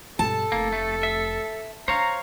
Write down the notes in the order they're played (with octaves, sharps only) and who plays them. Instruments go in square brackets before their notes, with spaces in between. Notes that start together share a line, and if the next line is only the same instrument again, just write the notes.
[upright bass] G2 B2 [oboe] A4 [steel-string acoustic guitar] A5
[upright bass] F1 [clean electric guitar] A#3
[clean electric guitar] A3
E5
[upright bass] D4 [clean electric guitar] C5 C#5 F5 [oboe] A#5